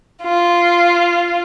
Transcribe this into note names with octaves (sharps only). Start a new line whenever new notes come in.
F4